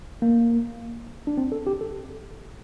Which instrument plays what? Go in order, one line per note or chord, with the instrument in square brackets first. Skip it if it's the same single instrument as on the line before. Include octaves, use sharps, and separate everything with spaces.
[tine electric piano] A#3
D4
C4
A4
G4
A4